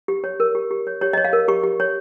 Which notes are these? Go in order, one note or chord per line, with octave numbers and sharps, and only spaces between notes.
G4
C#5
A#4
G4
G4
C#5
G4 C#5
D#5
C#5
F5
A#4
G4 C#6
G4
C#5